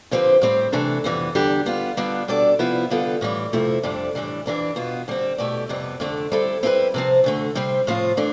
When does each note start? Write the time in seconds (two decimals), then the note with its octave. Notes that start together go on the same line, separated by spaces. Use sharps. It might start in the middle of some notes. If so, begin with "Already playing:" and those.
0.11 D3 F3 C4 G4 B4
0.41 A2 G3 C4 G4
0.72 C3 E3 A3 D4 A4
1.04 F2 E3 G3 B3
1.35 E2 D3 G3 D4 G4
1.66 G3 B3 F4
1.97 D3 G3 B3 D4 F4
2.28 B2 G3 D4 A4 D5
2.59 C3 F3 B3 E4
2.90 D3 G3 B3 F4 A4
3.21 A2 E3 G3
3.53 F2 C3 F3 A3 E4
3.83 F2 C3 G3 D4 A4
4.15 A2 E3 G3 D4
4.46 F2 E3 G3 D4 G4
4.76 B2 B3 F4
5.08 D3 G3 C4
5.38 B2 A3 E4 G4 D5
5.69 F2 C3 G3 B3
6.00 F2 D3 A3 D4
6.32 G3 C4 E4 A4
6.63 G3 C4 E4 G4 B4
6.94 C3 F3 C4
7.24 D2 D3 A3
7.55 C3 G3 C4
7.87 A2 F3 C4 F4
8.17 E3 A3 D4